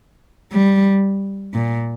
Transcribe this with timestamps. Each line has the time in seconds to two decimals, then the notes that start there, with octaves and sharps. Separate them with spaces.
0.52 G3
1.54 A#2